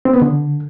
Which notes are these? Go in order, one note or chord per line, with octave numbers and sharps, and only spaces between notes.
C4
B3
D3